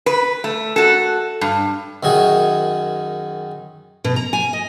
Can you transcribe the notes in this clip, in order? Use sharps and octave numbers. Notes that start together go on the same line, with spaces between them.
B4
A3
F#4 A4
G2
F#2 D#3 F#4 G#4
B2
A#5
G#5
D#5